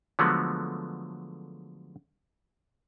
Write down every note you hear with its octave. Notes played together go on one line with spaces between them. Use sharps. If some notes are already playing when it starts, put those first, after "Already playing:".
D3 F3 F#3 G#3 A3 B3